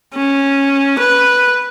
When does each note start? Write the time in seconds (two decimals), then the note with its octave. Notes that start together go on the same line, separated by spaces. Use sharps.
0.15 C#4
0.99 B4